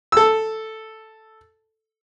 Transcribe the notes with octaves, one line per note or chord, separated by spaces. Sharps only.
A4 E6